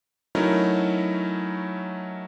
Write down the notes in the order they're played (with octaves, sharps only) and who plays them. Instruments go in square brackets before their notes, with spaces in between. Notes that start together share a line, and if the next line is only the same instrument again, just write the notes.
[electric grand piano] F#3 A3 C#4 D#4 E4 A#4